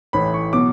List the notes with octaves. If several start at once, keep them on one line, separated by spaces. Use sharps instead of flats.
A1 A2 E3 B5
C#6
B2 F#3 D6